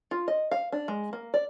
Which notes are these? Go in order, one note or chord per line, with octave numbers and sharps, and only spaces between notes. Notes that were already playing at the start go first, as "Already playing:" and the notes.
F4
D#5
F5
D4
G#3
A#3
D5